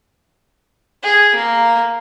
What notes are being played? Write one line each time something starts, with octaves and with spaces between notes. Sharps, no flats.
G#4
A#3